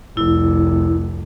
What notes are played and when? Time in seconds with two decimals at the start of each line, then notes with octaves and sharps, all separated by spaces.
0.17 F1 C2 E4